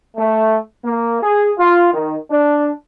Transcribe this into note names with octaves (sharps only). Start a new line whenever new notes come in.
A3
A#3
G#4
F4
D#3
D4